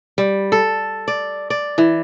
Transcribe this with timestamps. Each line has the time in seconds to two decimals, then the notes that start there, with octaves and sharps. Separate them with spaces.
0.18 G3
0.52 A4
1.08 D5
1.50 D5
1.78 E3